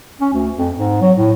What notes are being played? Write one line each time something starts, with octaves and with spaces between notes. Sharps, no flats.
C#4
D2
F2
G#2
F#3
A2